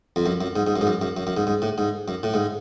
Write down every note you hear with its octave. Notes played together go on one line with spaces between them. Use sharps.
F2
F#2
F#2
G#2
G#2
F#2
G#2
F#2
F#2
F#2
F#2
G#2
G#2
A2
G#2
F#2
A2
G#2